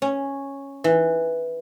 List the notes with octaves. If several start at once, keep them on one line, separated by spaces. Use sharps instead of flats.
C#4
E3